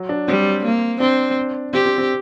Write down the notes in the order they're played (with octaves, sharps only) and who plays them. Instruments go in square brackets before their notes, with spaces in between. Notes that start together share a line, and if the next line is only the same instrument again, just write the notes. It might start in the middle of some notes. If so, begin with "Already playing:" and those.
Already playing: [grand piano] F#3
D4
[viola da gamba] G3 [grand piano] C4
[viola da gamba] A#3
[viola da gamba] C4 [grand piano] D4
[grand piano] C4 [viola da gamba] G4
[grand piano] C4
C4